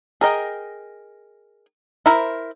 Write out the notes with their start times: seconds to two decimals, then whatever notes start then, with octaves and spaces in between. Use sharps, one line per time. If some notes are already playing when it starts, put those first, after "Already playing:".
0.21 G#4 A#4 D#5 G5
2.06 E4 A#4 C5